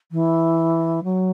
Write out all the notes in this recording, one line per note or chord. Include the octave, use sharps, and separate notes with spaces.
E3
F#3